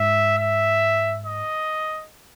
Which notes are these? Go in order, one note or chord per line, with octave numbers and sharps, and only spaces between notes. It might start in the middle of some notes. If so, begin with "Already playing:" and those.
Already playing: G#2 E5
E5
D#5